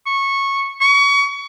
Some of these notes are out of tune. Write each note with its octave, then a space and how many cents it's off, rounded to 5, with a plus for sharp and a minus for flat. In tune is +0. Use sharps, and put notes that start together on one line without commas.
C#6 -15
C#6 +30